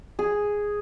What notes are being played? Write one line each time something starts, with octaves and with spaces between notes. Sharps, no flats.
G#4